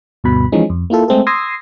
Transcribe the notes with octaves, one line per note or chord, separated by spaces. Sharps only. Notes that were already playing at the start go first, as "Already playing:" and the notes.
D2 G2 B2 B5
E3 F3 G#3 C#4 D#4
F2
A#3 E4 F4 A4
G#3 A3 C4 G#4 A4
C6 D#6 E6 G#6 A#6 C7